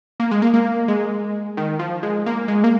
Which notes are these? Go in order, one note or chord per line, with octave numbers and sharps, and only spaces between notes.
A#3
G#3
A#3
A#3
G#3
D#3
F3
G#3
A#3
G#3
A#3